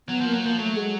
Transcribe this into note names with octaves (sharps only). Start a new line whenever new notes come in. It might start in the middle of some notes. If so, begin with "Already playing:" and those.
F#3 B3
F3 A#3
F#3
F3 A#3
F#3 A3
G#3